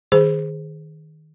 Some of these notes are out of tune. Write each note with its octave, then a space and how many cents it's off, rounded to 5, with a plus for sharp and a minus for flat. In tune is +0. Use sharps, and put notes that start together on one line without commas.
D#3 +0 G#4 +0 C5 +0